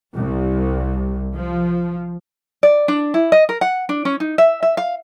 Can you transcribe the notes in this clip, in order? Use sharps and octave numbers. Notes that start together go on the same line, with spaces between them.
C2
F3
D5
D4
E4
D#5
A#4
F#5
D4
C#4
D#4
E5
E5
F5